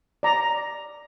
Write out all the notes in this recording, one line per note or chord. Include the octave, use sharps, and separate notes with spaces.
D5 A#5